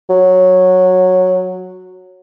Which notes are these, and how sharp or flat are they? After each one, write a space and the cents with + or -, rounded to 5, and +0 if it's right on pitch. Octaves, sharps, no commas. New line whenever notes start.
F#3 -10